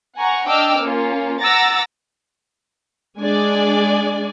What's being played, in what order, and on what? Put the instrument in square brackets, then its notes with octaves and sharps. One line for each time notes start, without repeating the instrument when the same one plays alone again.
[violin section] F#5 G#5 A#5 C#6
D4 D#5 G5 D6 E6 F6
A#3 C#4 F4
F#5 A#5 D6 E6 A6 A#6
[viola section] G#3 D4 G#4 D5 G#5